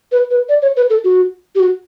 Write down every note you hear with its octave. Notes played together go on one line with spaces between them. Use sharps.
B4
B4
D5
C#5
B4
A4
F#4
G4
F#4